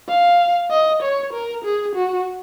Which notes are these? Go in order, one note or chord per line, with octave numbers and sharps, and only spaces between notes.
F5
D#5
C#5
A#4
G#4
F#4